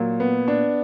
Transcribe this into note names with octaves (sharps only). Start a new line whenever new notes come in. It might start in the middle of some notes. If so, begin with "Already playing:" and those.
Already playing: A#2 F#3
B3
D4